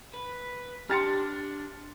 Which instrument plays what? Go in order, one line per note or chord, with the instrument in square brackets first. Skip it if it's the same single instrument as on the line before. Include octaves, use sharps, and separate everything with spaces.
[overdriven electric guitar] B4
[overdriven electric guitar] D4 [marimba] G4 G5 C6 [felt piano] F6 A6 C#7